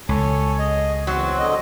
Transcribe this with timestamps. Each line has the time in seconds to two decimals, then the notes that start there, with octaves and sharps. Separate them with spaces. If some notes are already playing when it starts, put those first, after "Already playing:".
0.09 C#2 A4 C#5 G#5
0.59 G#4 D#5
1.07 E2 F#3 C4
1.39 D3 D#5